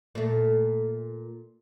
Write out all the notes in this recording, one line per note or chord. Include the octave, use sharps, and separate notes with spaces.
A#2 A3